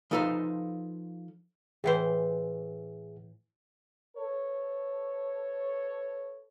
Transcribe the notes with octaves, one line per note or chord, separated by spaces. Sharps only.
F3 D#4 A4 B4 C5
A2 E3 G#4 C5 E5 F#5
A4 B4 C#5